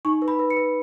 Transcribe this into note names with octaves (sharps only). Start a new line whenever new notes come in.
D#4 C#6
B4
B5
B4
C#7
B4